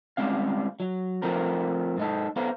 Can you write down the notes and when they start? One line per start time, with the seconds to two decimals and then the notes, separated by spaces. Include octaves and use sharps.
0.17 G3 G#3 C4 C#4 F5
0.80 F#3
1.22 F3 A3 C4 A#4
1.97 G#2 D#4 A4
2.36 B3 A4 C5 F5 A#5